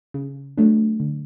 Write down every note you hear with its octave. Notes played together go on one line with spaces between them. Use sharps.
C#3
F#3 A3 D4
D3